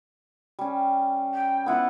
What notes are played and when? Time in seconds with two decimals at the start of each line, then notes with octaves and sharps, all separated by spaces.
0.59 G3 C#4
1.34 G5
1.66 B3 E4 F4 F#5